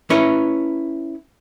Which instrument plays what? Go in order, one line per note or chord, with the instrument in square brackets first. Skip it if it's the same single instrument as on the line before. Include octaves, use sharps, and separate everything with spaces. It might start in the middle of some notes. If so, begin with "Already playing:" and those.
[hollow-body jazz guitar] C#4 E4 B4 C#5